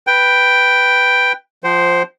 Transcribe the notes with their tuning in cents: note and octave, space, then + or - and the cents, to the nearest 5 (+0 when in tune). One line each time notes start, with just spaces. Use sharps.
B4 +0 G5 +0
F3 +0 C5 +0 G5 -45